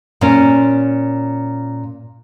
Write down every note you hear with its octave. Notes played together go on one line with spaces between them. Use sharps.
A#2 C#4